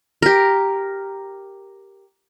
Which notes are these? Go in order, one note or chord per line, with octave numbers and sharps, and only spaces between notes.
G4 A#4